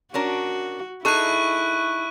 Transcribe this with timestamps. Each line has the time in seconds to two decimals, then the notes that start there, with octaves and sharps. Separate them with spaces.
0.14 C#4 D4 F#4 A#4
1.05 D#4 E4 G#4 A4 C#6 F#6 D#7